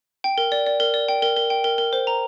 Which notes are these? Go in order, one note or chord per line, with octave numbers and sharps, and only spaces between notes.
G5
A#4
D5
D5
A#4
D5
G5
A#4
A#4
G5
A#4
A#4
C5
A#5